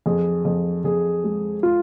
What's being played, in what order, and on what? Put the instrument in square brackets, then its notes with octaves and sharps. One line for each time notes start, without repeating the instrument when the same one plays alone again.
[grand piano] F2 [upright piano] G#4
[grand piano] F2
[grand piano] F2 [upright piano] G#4
[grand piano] G#3
[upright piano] F4